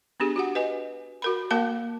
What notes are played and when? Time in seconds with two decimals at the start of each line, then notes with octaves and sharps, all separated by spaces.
0.20 B3 D4 G4 G#4
0.36 F#4 G4 F#5
0.55 B4 D#5 G#5
1.22 F#4 A#4 B5
1.50 A#3 A#4 F5 A5 D6